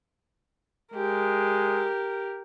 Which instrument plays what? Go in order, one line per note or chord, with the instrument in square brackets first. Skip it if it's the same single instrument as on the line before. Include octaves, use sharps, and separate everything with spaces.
[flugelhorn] G#3 [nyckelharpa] G4 A#4